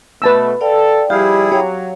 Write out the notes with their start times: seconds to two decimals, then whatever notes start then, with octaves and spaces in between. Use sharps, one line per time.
0.22 B2 A3 B4 A5 E6
0.61 A4 D5 F5 G5
1.10 F3 G3 E4 G4 G#4 F5
1.52 F#3 G4 C#5 F5